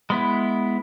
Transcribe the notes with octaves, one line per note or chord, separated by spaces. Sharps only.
G#3 B3 E4